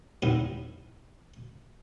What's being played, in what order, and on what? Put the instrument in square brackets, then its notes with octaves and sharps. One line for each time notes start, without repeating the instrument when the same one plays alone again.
[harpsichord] G2 D#3 G3 B3 C4 E4